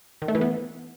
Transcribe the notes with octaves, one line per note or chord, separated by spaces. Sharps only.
D#3
A3
E3
B3